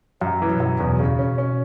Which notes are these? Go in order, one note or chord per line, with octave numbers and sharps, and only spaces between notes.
F#2 F#3
E3
B2
F#2
E2 B2
C#3
C#4
C#4